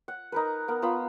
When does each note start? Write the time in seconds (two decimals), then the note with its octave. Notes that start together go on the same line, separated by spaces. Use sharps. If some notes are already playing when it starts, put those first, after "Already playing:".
0.08 F#5
0.32 D#4 A#4 B4
0.68 B3 A#4
0.82 B3 F4 B4 B5